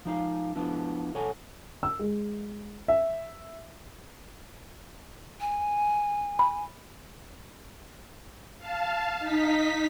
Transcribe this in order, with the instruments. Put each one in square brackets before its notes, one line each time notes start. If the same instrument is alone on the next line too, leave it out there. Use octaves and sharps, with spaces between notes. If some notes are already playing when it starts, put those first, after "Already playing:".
[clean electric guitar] F3 D#4 F5
F3 B3 D4 E4
B1 A4 C#5 F#5 G#5
[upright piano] E6
G#3
E5
[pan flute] G#5
[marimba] B5
[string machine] F5 A5
D#4 B6